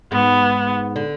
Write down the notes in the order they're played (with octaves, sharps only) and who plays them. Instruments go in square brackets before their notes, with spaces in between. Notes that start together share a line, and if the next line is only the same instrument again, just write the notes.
[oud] G#2 [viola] B3
[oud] D3